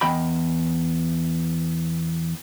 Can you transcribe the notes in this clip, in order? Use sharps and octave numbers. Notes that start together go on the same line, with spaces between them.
E2 D#5 G5 B5